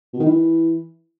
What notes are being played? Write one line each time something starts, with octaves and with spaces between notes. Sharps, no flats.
B2
D#3
E3